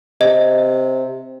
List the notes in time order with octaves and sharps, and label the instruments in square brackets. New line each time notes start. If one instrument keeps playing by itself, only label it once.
[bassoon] C3 [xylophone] D#5